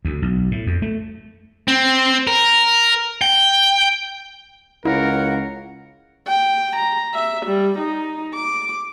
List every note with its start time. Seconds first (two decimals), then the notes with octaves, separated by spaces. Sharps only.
0.05 D2
0.22 B1
0.51 A2
0.67 F2
0.82 A3
1.68 C4
2.27 A#4
3.22 G5
4.85 C#2 E4 A#4 C#5 F5 F#5
6.27 G5
6.76 A#5
7.14 E5
7.46 G3
7.79 D#4
8.35 D6